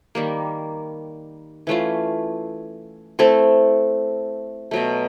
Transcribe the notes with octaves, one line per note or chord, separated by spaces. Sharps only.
D#3 G3 A#3
E3 A3 C#4 F4
A3 C4 E4 A4
B2 F#3 A3